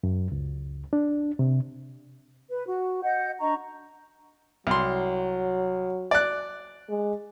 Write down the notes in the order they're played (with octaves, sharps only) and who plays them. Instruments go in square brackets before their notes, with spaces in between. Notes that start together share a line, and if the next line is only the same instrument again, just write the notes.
[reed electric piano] F#2
C#2
D4
C3
[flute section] B4
F#4
D#5 F#5 G6
D4 D#5 A#5 C#6
[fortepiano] C2 C6 [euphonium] F#3
[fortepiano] D5 F#6
[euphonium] G#3